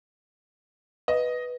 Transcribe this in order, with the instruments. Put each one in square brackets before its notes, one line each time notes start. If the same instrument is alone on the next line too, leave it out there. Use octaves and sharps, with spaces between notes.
[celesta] B4 [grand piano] D#5